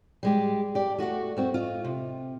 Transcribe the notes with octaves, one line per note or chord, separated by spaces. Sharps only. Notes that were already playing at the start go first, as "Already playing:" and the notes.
G3 G#3 G4
G4 D5
A3 F#4 C#5 F#5
F#2 C4 F#4
F4 D#5
C3